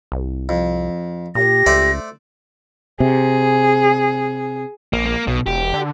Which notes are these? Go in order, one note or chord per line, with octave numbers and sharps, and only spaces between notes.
C2
F2
A#2 G4 A#6
C#2 A3 C5 D5
C3 G#4
A#1 A#3
A#3
B1 B2
E1 G4
D3